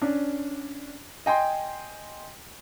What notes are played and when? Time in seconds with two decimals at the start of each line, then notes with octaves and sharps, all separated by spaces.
0.01 C#4 D4
1.26 D#5 G5 G#5 C6